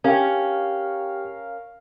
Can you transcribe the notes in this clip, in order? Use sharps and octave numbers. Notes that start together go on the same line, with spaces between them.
C#4 G4 A#4 F5 G5